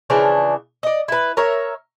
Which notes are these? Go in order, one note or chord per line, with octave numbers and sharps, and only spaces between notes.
C#3 E3 F3 D4
D5 D#5
E4 B4
A#4 C#5 E5